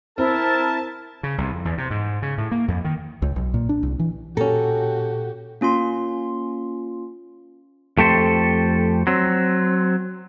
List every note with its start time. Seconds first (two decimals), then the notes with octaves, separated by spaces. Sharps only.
0.18 C4 E4 A#4 A5
1.23 C#3
1.38 C2
1.53 F2
1.65 E2
1.78 C3
1.90 G#2
2.22 C#3
2.38 A2
2.51 A#3
2.68 F2
2.85 D#3
3.22 C#2
3.36 B1
3.54 A#2
3.69 D4
3.83 C2
4.00 E3
4.37 A#2 C#4 F#4 G4 A4 A#5
5.61 A#3 C#4 F4 C6
7.98 F2 A3 G4 A4 C5
9.07 F#3 C4